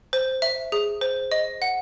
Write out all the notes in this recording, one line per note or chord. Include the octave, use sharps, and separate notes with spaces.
C5
E5
G#4
C5
D#5
F#5